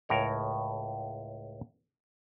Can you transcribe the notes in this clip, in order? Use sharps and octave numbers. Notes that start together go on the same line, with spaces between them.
C#2 A2 A#4 C#5